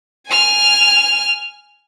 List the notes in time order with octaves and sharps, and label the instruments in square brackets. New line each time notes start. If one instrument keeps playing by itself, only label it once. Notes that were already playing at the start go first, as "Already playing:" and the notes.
[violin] G#5 F6